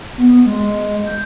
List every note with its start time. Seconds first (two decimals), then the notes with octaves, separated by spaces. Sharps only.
0.18 B3
0.46 G#3
1.06 G6